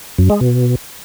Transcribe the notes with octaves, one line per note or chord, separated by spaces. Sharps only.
F#2
G#3
B2